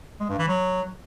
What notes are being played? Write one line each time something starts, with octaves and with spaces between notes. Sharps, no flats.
G#3
G2
E3
F#3